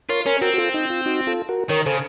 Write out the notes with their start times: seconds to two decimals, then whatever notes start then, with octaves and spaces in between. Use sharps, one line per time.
0.09 F4 A#4 C#5
0.26 C#4 A#4 C#5
0.41 C4 F#4 A#4
0.54 F#4
0.58 F4 A4
0.74 D#4
0.90 F4
1.06 D#4 F#4
1.27 F4 A4
1.49 F#4 A#4
1.69 D#3 A#4 C#5
1.86 C#3 A4 C5